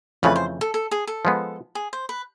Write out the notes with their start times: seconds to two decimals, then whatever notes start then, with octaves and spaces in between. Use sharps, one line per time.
0.23 F2 C#3 E3 A3 B4
0.36 C5
0.61 A4
0.74 A4
0.91 G#4
1.07 A4
1.25 F3 G#3 B3
1.75 G#4
1.93 C5
2.09 B4